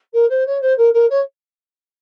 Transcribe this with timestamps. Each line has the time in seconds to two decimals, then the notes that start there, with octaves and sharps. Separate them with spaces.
0.13 A#4
0.29 C5
0.46 C#5
0.61 C5
0.77 A#4
0.93 A#4
1.09 C#5